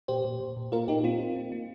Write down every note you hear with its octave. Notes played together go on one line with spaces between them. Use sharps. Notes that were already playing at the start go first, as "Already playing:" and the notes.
A#2 G4 C5
A#2
A#2
A#2
A#3 F4 A#4
A#2 D#4 G4
A#3 C4 F4
A#3
A#3
A#3